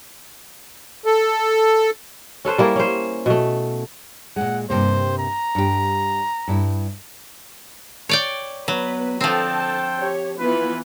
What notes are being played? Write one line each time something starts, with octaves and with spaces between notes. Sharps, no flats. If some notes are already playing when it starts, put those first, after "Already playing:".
A4
C#4 A4 B4 C5
G3 A#3 E4
C#4 C5
B2 A3
A#2 G#3 F#5
G2 C3 A#3 C5
A#5
G2 G4
G2 E4
C#5 D5 G5
F#3 B3 B4
D3 F3 C4 A4 C5 G5 A5
G4 C#5
E3 B3 F4 B4